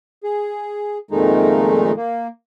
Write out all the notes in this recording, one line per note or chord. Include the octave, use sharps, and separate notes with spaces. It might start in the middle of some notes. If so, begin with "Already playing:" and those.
G#4
F2 A#2 D#3 G#3 A3 D#4
A#3